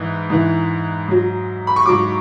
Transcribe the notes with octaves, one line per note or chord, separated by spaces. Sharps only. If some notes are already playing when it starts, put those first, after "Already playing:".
Already playing: G#2 E3
G#2 E3
G#2 F#3
B5
C#6
G#2 F#3 D6